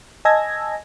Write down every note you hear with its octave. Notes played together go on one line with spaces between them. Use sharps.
D#5 G#5 A5 E6 G#6 A#6